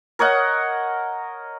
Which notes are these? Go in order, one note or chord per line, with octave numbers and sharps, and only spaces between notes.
A#4 C#5 D#5 F#5